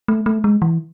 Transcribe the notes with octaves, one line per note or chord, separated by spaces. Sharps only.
A3
A3
G#3
E3